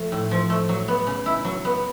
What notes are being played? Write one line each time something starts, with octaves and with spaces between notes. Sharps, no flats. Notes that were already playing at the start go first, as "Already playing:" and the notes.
Already playing: F3 A3
A2
F3
A3
F#3
B3
C#3
E4
F#3
B3